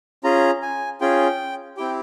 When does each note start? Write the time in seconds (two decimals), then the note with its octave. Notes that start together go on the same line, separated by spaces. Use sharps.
0.24 C#4 F4 G#4 A#5
0.62 G#5
1.01 C#4 F4 G#4 G5
1.77 C4 E4 G4 G5